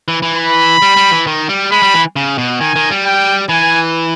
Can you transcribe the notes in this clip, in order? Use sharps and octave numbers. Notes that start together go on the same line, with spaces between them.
E3
E3
B5
G3
G3
E3
D#3
G3
G#3 B5
G3
E3
C#3
B2
D#3 G#5
D#3
G3
G5
E3 G#5